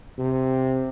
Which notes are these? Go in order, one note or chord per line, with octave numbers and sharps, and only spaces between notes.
C3